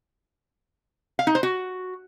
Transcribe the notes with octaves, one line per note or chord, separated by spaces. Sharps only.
F5
D#4
C5
F#4